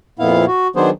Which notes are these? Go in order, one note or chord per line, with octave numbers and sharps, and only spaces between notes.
F2 A#2 B3 E4 F5
F#4
D#3 F#3 B3 D4 G#4 C5